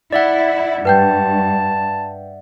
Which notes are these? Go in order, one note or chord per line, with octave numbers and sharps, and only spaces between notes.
E4 D5 E5 F#5
G2 B4 G5 A5 G6